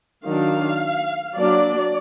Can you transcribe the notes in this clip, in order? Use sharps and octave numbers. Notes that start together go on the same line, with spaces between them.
D#3 F#3 D4 F5
F#3 A#3 D4 D5